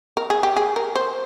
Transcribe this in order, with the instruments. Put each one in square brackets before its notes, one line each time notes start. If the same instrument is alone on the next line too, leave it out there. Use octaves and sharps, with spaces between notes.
[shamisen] A#4
G#4
G4
G#4
A#4
C5